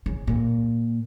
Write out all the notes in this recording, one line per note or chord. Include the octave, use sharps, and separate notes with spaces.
C#3
A#2